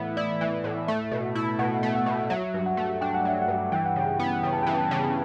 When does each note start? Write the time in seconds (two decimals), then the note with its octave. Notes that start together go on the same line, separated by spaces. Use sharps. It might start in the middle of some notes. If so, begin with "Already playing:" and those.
Already playing: A2 E3 B3 E5
0.17 E4 D5
0.41 E3
0.64 A2
0.87 A3 E5
1.11 B2
1.35 E4
1.59 B2 F#5
1.83 A3
1.95 F#5
2.06 B2
2.30 F#3 E5
2.54 G2
2.66 F#5
2.77 A3
3.01 D4 G5
3.14 F#5
3.25 F#3 E5
3.42 F#5
3.48 G2
3.72 E3 G5
3.86 F#5
3.96 C#3 G5
4.19 B3
4.43 C#3 G5
4.53 A5
4.63 E3 G5
4.78 A5
4.91 C#3